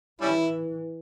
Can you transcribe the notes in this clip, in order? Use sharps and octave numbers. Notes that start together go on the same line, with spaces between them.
E3 G3 C#4 E4